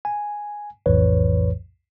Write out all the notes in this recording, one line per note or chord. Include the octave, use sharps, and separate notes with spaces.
G#5
B1 F2 A2 E3 B4 C#5